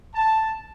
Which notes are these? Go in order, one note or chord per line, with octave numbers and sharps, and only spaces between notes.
A5